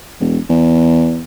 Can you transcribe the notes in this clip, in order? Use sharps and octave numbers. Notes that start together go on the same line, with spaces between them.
E1
E2